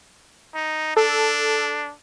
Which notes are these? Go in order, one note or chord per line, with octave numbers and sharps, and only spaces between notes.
D#4
D4 A4